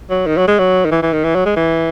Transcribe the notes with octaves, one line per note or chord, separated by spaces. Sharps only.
F#3
D#3
F#3
G#3
F#3
D#3
E3
E3
D#3
E3
F#3
G#3
E3